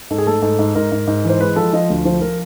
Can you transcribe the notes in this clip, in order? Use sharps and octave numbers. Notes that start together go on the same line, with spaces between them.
G#2 A4
G#4
A3 A4
G#2 A4
G#2
G#2 A#4
G#2
G#2
E3 C5
G#3 B4
F3 A4
F3 D#5
D2
F3 C5
F3 A#4